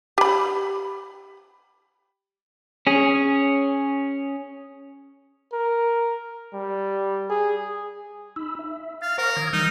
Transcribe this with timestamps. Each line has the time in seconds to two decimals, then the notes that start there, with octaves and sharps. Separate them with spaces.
0.18 G4 B5
2.87 C#4 G#4
5.53 A#4
6.54 G3
7.30 G#4
8.36 D#4 B5 E6
8.59 E5
9.02 F5 A6
9.18 A#4 C5 F#5 C#6
9.36 D#3 D#6 G#6
9.53 E3 G3 D#4 E6